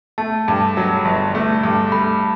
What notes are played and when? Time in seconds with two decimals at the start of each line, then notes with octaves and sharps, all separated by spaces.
0.18 A3 A5
0.48 G2
0.77 F#3
1.05 G1
1.35 A3
1.64 G2
1.92 A3 B5